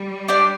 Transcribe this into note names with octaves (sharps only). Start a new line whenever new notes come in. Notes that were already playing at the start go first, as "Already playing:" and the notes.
Already playing: G3
D4 G4 D5